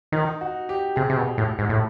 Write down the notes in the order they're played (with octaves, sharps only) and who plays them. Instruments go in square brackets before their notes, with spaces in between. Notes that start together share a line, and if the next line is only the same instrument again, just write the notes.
[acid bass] D#3 [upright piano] D#4
[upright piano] F#4
G4
[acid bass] C3 [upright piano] G#4
[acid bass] C3
B2
A2
G#2
A2